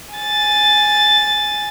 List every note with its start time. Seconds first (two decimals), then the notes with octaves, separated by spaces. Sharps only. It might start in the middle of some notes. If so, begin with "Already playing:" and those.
0.14 G#5 A6